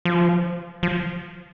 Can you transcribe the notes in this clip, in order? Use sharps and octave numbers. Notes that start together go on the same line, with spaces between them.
F3
F3